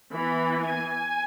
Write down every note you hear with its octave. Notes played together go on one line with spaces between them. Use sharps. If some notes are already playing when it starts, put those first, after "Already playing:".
E3 B3 B5
G#5